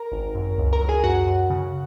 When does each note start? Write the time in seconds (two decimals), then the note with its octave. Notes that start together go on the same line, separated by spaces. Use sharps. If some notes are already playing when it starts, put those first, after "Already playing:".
Already playing: A#4 A#5
0.12 G#1
0.35 F#2
0.58 C#2
0.73 A#4 A#5
0.81 F#3
0.89 G#4 G#5
1.04 F#2 F#4 F#5
1.27 F#2
1.50 C#3